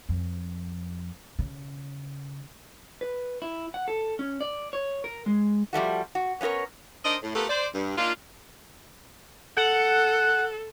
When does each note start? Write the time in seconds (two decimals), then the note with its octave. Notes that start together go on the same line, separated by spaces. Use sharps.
0.09 F2
1.39 C#3
3.01 B4
3.42 E4
3.74 F#5
3.88 A4
4.19 C#4
4.41 D5
4.73 C#5
5.04 A#4
5.26 G#3
5.73 F3 G3 A3 F#4
6.15 F#4
6.41 B3 C#4 F4 A#4 C#5
7.04 D4 D#4 A#4 C5 D#5
7.22 A2
7.34 A3 B3 F4 G4 A4 A#4
7.49 C5 D5
7.74 G2
7.98 A#3 D4 D#4 F4
9.57 A4 F#5